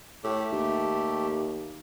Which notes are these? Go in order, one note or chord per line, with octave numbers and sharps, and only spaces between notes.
A2 A3 G4
D#2